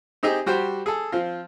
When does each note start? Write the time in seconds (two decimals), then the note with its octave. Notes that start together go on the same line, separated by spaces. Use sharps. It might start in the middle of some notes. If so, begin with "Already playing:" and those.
0.23 C4 D#4 G4 G#4
0.46 G3 F#4 G4 C5
0.86 G#4 A4
1.12 F3 C4 F4